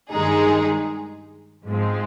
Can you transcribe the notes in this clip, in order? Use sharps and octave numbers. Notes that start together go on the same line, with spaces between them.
G2 D#3 G#3 D#4 G#4
G#2 F3 G#3 C4